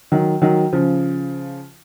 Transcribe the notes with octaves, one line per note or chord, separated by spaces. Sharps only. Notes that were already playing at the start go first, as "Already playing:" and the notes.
D#3 F#3
D#3 F#3
C#3 F3